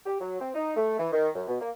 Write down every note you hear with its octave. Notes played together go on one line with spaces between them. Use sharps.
G4
F#3
C4
D#4
A3
E3
D#3
F#2
B2
A#3